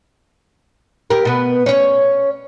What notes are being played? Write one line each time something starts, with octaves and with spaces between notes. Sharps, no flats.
G4 A#4
B2 B3
C#4 C#5